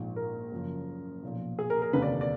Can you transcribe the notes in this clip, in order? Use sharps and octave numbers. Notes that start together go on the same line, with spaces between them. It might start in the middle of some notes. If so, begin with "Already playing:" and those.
Already playing: A#1 G#2 F3
A#4
F#1 F#2 F3
B1 A#2 F3
G#4
A#4
A#4
F1 D#2 D3 B4
D5
D5